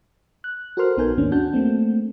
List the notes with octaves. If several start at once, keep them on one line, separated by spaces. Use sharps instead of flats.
F#6
F#4 A4 A#4 C5 C6 F6
A#1 B3 D#4 A#4 G#5 G6
D#2 G#2 D#3 A#3 C#4 D4
D4 F#4 F#5 A5 G6
A3 A#3 C4 D4